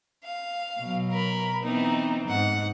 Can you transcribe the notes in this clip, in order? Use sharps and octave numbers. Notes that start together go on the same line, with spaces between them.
F5
B2 F#3
A#4 B5
E3 B3 C4 D#4
G#2 F#5